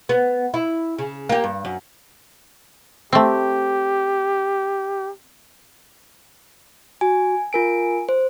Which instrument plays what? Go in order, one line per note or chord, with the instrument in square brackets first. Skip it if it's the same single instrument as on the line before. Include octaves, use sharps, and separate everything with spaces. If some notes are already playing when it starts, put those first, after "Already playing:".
[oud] B3
E4
C#3
A#3 G4
G2
F#2
[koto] A3 C4 [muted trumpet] G4
[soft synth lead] F#4 [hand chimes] G#5
[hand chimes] F4 A#4 D7 [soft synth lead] G#5
[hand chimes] C5